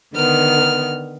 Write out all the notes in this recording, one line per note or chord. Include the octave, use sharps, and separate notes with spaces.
D3 D#3 B3 F6